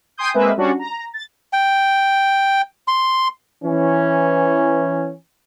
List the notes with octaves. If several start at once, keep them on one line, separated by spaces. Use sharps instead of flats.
G5 G#5 C6 D#6 G6
G#3 A#3 C4 B4 E5
G3 C#4 D4 F#4
A#5
A6
G5
C6
E3 C#4